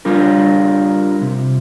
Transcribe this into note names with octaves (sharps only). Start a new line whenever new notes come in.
G3 D4 F4 A#4
C3